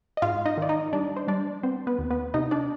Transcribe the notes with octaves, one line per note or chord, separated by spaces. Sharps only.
D#5
G#2 F4 F5
D#4 D#5
D#3 D5
D#4 D#5
G3 D4 D5
C5
G3 D4 D5
B3 C4 C5
B3 B4
D#2
B3 B4
C3 D#4 D#5
D4 D5